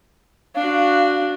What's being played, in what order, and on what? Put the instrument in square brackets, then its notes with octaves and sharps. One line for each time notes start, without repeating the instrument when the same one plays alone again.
[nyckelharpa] D4 F#4 [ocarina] F5